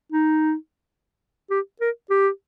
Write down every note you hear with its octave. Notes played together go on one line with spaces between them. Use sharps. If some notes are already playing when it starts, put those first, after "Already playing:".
D#4
G4
A#4
G4